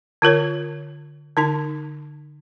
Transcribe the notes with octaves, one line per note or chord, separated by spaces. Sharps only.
D3 F4 A#4 C#5
D3 D#4 A5